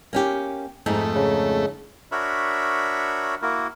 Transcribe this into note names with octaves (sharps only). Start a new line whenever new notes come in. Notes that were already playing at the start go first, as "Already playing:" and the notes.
A#3 C#4 G4
F2 G#2 A3 D#4
C#3
D4 F#4 A#4 C#5 E5 B5
A#3 E4 F#4 A#4